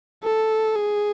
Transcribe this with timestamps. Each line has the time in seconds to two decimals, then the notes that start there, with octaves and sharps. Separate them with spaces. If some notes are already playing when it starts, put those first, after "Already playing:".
0.24 A4
0.76 G#4